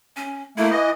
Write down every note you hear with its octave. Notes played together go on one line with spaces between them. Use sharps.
C#4
A3 A#3 E4
E3 D#5